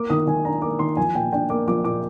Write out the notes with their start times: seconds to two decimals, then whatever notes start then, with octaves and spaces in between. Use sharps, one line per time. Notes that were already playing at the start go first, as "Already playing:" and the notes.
Already playing: A#3 D6
0.10 D#3 D#6
0.27 D#3 G#5
0.45 D4 A#5
0.62 A#3 D6
0.79 D#3 C6
0.97 F3 G#5
1.15 A#2 G5
1.33 D4 G5
1.50 A#3 D6
1.68 F3 D6
1.84 A#2 D6